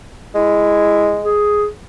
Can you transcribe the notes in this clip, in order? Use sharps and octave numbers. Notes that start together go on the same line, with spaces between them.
G#3 E4
G#4